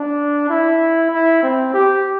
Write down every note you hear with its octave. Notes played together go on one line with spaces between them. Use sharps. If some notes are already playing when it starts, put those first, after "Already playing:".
Already playing: D4
E4
E4
C4
G4